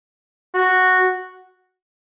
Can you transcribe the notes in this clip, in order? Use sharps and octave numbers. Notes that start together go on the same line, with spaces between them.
F#4